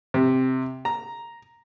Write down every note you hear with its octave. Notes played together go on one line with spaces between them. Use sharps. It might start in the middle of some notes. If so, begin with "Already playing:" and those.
C3
A#5